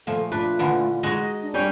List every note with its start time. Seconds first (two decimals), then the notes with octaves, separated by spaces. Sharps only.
0.07 A#2 F3 A3 A4
0.32 D4 F4 B4
0.59 A#2 D3 E3
1.03 G#3 D#4 F#4 D#5
1.42 D4
1.54 G3 C#4 G5